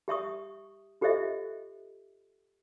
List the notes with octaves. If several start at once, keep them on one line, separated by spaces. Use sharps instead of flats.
G4 E5 C#6 D#6
F4 G4 A4 C5 D#5 E5